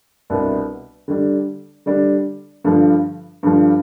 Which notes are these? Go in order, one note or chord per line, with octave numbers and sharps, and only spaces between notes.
C2 B2 B3 D4
D3 G3 D4
D3 G3 D4
G2 D3 F3
G2 D3 F3